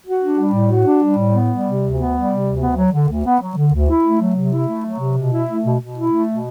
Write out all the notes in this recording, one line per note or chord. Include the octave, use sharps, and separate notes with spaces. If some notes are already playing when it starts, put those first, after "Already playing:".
F#4
D4
G3
A2
F#4
D4
G3
A2
B3
G3
C3
D2
B3
G3
C3
D2
B3
F#3
D3
D2
B3
F#3
D3
D2
E4
A3
F#3
C3
E4
A3
F#3
C3
B2
E4
A3
B2
B2
E4
A3
B2